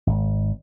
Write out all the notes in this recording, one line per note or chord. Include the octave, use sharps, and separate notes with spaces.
G#1